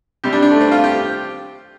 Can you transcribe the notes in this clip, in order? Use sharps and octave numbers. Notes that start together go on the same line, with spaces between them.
C3 G3 G4
D4
D4
A3
C4
F4
G4